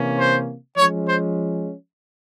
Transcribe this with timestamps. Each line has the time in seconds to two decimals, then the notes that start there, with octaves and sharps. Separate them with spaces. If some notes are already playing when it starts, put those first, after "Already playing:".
Already playing: C3 E3 A#3 C#4
0.18 C5
0.77 F3 G#3 C#4 C#5
1.07 C5